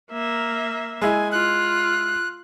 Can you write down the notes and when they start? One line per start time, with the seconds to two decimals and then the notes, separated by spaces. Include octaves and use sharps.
0.11 A#3 E5
1.02 G#3 E4 G#5
1.32 F4 F#6